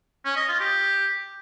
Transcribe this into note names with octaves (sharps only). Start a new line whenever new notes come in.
C#4
D#5
F4
G4